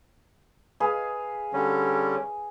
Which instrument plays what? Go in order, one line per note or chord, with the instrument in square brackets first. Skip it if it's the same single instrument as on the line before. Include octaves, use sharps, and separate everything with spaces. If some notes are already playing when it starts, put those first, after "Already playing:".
[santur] G#4 B4 F5
[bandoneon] D3 G3 C#4